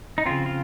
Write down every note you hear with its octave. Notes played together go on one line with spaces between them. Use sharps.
D#4
C#3 F3 C4 F4
F4